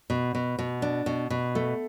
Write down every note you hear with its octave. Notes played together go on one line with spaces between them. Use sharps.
B2
B2
B2
D4
B2
B2
A3